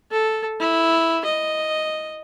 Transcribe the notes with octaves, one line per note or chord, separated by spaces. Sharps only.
A4
E4
D#5